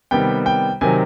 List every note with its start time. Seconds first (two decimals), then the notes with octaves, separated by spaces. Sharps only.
0.11 C3 D#3 G3 B3 G5
0.46 G5
0.81 C3 D#3 F#3 G#5